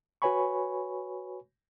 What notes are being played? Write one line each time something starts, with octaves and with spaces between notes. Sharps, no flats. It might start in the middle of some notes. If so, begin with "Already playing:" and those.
F#4 B4 C#5 G#5 B5 C#6